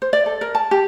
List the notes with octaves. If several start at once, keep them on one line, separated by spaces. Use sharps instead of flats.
C5
D5
A4
A#4
A5
G4